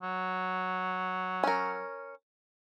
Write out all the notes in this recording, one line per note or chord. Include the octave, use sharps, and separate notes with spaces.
F#3
C#4 A#4